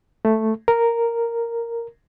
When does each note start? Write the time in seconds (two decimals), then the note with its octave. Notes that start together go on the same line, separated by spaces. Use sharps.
0.25 A3
0.68 A#4